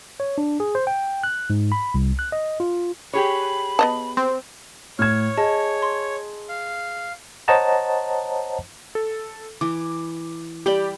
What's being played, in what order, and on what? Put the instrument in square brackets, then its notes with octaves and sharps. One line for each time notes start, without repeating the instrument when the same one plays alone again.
[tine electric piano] C#5
D4
G#4
C5
G5
F#6
G#2
B5
C2
F#6
D#5
F4
[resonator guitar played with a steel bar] G4 G#4 C#5 [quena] B5
[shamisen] B3 D#5 A5
[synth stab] C4
[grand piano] A2 G#6 [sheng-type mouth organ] C#5 [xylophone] F6 E7
[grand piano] G#4 [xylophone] D#5 A5
[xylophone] C6
[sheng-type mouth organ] F5
[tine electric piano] C5 C#5 D#5 F#5 A5 A#5
[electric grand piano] A4
[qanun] E3 [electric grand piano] D6
[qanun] G3 G5 B5 [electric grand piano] G4 D5